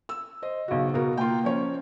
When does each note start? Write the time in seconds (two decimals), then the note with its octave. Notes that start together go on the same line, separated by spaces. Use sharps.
0.09 E6
0.43 C5 D#5
0.68 B1 C#3 F#4
0.94 B2 F#4 A#4
1.17 A#3 F4 G5
1.44 F3 C#4 C#5